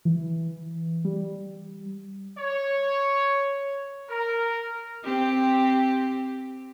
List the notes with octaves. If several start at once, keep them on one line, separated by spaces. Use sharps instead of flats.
E3
G3
C#5
A#4
C4 G4